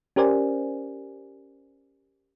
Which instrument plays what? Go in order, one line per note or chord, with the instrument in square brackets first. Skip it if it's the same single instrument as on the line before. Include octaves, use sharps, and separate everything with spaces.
[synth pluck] C#4 G4 A#4 C5 D5 G#5